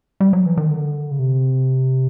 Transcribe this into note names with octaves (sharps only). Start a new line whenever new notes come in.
G3
F#3
E3
D#3
D3
C#3
C3